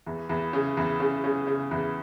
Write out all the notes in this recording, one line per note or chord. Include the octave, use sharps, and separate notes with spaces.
E2
E2
C#3
E2
C#3
C#3
C#3
E2